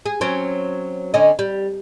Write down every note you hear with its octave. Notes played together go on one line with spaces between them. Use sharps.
G#4
F#3 C4 C#4
D3 C#4 D#5
G3